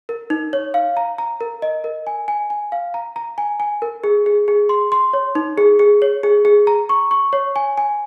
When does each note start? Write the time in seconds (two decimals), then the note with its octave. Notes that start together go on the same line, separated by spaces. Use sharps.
0.09 A#4
0.30 D#4
0.53 C#5
0.74 F5
0.97 A#5
1.18 A#5
1.41 A#4
1.62 D#5
1.84 A#4
2.07 G#5
2.28 G#5
2.50 G#5
2.72 F5
2.94 A#5
3.16 A#5
3.38 G#5
3.60 G#5
3.82 A#4
4.04 G#4
4.26 G#4
4.48 G#4
4.69 C6
4.92 C6
5.13 C#5
5.35 D#4
5.58 G#4
5.79 G#4
6.02 C#5
6.23 G#4
6.45 G#4
6.67 A#5
6.89 C#6
7.11 C#6
7.33 C#5
7.56 G#5
7.78 G#5